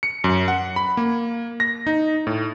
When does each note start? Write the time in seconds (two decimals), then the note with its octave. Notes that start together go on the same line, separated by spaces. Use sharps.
0.03 C#7
0.24 F#2
0.48 F#5
0.76 B5
0.97 A#3
1.60 A#6
1.87 D#4
2.27 A2